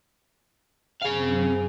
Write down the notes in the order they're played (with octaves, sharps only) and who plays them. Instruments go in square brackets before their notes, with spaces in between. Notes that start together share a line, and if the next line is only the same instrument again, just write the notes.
[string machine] F#2 C4 [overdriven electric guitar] G#4 F5